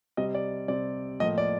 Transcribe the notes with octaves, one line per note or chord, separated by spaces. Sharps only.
C3 G3 C4 D#5
D5
C3 G3 C4 D5
A2 F3 A#3 D#5
D5